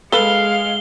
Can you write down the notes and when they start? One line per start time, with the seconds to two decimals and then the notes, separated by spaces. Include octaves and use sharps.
0.12 G#3 A4 B4 F5 G7